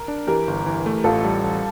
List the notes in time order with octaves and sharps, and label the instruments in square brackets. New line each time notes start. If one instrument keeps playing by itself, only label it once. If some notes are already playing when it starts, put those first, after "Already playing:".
Already playing: [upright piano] A#4
[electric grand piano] D4
[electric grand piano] E3 [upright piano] G4 A#4
[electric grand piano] G1
E3
A3
[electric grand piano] A1 [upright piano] F4 A4
[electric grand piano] G3
A1